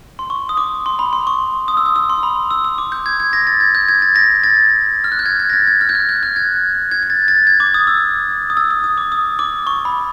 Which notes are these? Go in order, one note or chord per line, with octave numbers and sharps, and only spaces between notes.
C6
C#6
D#6
D6
C6
B5
C6
C#6
D#6
E6
D#6
E6
C6
B5
E6
E6
D6
G6
G#6
G#6
A#6
A6
G#6
G6
G#6
A6
A#6
A6
F6
F#6
G6
G#6
G#6
A#6
A6
G#6
F6
G6
F#6
G6
F#6
G#6
G#6
G#6
A6
A6
G#6
D6
D#6
E6
D#6
E6
D#6
D#6
D6
D#6
D6
C#6
B5